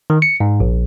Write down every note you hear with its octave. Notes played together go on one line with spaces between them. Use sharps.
D#3
C#7
G#2
A#1